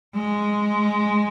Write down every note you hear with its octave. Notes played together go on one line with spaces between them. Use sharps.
G#3